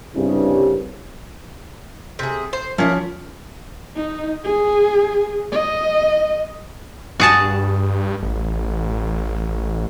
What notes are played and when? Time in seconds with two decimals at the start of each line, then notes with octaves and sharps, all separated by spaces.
0.15 C2 G2 C#3
2.19 C3 G#4
2.53 C5
2.78 F3 A#3 C#4 E4
3.96 D#4
4.44 G#4
5.52 D#5
7.20 G2 F#4 G#4 A5
8.22 A1